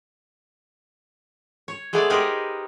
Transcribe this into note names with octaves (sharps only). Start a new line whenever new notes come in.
C#5
G#3 A3 B3 G#4 D5
C4 D#4 G4 G#4 A#4 B4